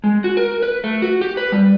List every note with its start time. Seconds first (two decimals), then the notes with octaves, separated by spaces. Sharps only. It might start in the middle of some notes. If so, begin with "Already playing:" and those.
0.04 G#3
0.24 F#4
0.37 A#4
0.63 B4
0.84 A3
1.02 F#4
1.21 G4
1.37 B4
1.52 G3